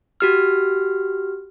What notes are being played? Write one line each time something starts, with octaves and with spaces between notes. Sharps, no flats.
F#4 G4 F6